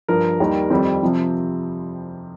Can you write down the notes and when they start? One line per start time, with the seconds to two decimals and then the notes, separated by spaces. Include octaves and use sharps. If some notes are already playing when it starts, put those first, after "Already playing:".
0.08 G2 F3 A#4
0.40 D#2 D#3 G3
0.70 F2 D#3 G3 C4
1.03 C3 F3